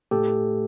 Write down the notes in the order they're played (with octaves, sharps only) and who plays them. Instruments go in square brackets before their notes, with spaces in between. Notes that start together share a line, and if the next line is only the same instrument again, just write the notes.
[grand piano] A2 [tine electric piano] G4 A4